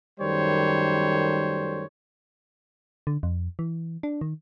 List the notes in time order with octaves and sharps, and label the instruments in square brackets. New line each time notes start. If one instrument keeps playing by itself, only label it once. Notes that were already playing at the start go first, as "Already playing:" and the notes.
[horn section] F#2 D#3 G3 A3 C5 C#5
[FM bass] D3
F2
E3
D4
D#3